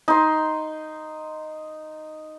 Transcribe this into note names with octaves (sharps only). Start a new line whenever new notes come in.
D#4 C6